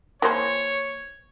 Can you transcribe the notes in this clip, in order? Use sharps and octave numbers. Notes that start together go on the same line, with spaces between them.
E3 A#3 C5 C#5